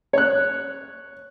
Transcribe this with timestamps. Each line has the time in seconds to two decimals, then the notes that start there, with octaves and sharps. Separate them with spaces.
0.13 C#5 F#6